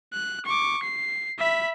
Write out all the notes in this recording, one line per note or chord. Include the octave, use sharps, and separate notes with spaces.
F#6
C#6 D6
C7
E5 B5